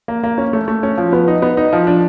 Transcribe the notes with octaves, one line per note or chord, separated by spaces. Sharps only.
A#3
A#3
C#4
A3
A3
C#4
F3
B3
D#4
B3
D#4
F3
D4